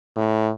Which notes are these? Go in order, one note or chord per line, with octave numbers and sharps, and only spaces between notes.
A2